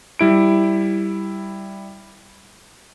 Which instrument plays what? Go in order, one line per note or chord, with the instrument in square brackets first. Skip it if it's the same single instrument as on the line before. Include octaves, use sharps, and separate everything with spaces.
[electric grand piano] G3 E4 D7